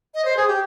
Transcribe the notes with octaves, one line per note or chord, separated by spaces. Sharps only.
D#5
C5
G#4
G4